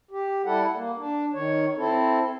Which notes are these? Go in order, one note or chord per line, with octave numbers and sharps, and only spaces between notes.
G4
G3 E4 A4 F#5
A#3
D4
D#3 C#5
C4 E4 A4